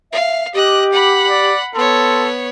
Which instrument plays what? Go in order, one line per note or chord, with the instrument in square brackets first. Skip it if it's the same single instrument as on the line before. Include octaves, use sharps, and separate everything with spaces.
[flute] E5 [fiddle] F5
[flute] G4 [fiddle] D#5 F#6 [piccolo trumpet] D6
[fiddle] F#5 B5
[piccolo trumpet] D5
[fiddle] B3 C#5 [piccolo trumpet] A4 [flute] C6